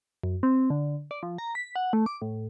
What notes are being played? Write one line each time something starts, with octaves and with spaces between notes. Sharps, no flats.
F#2
C4
D3
D5
F3
A#5
B6
F#5
A3
D6
A2